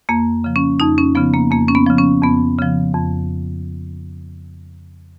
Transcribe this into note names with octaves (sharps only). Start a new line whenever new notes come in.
F2 A#3
C#3 F3
C#4
F2 D#4
C#4
C#3 F3 B3
A#3
F2 A#3
C#4
B3
C#3 F3
C#4
F2 B3
C#3 F3
F2